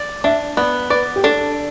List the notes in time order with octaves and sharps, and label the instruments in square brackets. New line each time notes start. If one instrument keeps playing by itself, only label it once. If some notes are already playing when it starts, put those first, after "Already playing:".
Already playing: [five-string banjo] D5
[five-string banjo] D4 [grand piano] E5
[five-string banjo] B3 [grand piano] D5
[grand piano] B4 [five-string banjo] D5
[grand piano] G4
[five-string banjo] D4 [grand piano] A4